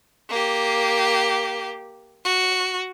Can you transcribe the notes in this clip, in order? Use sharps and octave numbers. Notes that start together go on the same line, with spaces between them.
A#3 G4
F#4